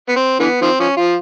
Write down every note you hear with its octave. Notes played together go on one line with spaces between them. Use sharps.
B3
C4
D3 E3 B3
D#3 F3 C4
F3 C#4
F3 F4